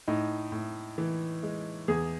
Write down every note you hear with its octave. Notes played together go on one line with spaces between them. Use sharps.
A2 D#4
A2
E3
G#3
E2 G#4